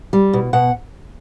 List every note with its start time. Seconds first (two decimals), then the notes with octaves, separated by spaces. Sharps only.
0.13 G3
0.33 B2
0.53 B2 F#5